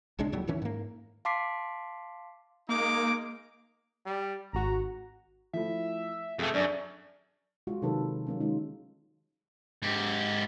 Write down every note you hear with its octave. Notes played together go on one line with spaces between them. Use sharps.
A#1 C#3 G#3 D4
D#2 A2 F#3 G3
A2 D#3 E3 C#4
G#2 A#3
F5 A5 C6 D6 B6 C7
G#3 A#3 D#4 D6
G3
G#1 F#4 A#5
F3 A3 E4 E5
F2 A3 G#4 A4
F#2 D4 D5
G#3 F4 F#4
C3 D#3 F#3 D#4 A4 B4
F#3 A#3 C#4
D#3 G#3 D#4 F4
G#2 G4